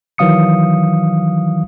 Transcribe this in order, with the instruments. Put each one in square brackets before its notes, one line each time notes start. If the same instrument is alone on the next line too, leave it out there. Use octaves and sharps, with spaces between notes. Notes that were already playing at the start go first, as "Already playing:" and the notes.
[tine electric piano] D#3 E3 F#3 F5 D#6 C#7